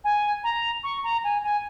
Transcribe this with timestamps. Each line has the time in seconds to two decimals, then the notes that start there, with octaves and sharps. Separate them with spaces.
0.04 G#5
0.44 A#5
0.84 C#6
1.04 A#5
1.24 G#5
1.43 G#5